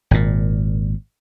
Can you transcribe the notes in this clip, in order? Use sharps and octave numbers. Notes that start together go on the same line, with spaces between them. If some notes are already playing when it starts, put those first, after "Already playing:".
G#1 A#2